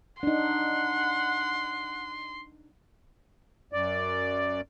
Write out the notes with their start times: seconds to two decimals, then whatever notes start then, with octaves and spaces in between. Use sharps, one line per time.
0.23 D4 D#4 F#5 C6
3.73 F#2 D5